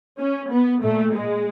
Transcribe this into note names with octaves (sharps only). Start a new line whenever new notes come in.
C#4
B3
A#2 A3
G#3